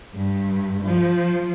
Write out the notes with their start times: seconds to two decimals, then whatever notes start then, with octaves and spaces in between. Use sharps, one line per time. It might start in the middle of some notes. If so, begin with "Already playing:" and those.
0.15 G2
0.83 F3